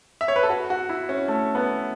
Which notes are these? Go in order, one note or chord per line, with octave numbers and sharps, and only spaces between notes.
E5
C#5
B4
A4
F#4
F#4
E4
C#4
A3
B3